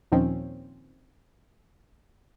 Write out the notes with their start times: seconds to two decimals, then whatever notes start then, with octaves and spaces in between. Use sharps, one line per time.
0.12 D#2 A#2 D#3 F3 C4 C#4